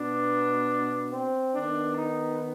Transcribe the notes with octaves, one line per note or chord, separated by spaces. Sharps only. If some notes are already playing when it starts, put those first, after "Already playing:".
Already playing: B2 B3 D4
C4
D#3 B3 D4
D#4